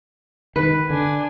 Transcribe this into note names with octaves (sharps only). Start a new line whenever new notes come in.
D#3 B4
D3 D4 G#5